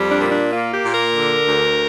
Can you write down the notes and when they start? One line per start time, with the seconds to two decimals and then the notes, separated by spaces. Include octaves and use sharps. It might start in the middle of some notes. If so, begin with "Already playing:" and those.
Already playing: F2 G3
0.10 D4
0.20 A#2
0.31 D4
0.52 A#3 F4
0.72 G4
0.83 A#2
0.94 A#4
1.14 D3
1.45 D2